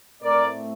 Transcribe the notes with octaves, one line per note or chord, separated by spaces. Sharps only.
A2 A3 C4 A#4 D5